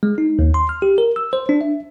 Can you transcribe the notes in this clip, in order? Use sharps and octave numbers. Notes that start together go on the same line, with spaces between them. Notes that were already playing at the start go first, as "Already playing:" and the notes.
G#3
D#4
D#2
C6
F6
G4
A#4
E6
C5
D4
E5